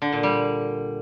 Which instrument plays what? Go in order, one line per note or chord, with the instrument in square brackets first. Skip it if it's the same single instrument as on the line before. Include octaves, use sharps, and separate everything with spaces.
[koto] D3
A#2
G3